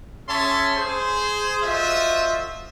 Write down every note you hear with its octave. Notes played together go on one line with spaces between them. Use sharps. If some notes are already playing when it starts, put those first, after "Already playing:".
C#4 G#4 C#5 E5 A5 C6
G#4 C5
F4 F#4 A4 C5 D#5 E5